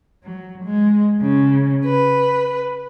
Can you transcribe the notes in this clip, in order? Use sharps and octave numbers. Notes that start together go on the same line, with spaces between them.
F#3
G#3
C#3
B4